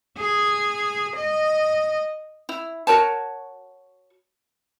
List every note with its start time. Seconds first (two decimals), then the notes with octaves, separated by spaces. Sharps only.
0.18 G#4
1.15 D#5
2.49 E4
2.87 F#4 A#4 C#5 A5